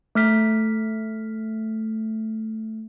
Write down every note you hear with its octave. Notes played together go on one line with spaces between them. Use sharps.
A3 F6 B6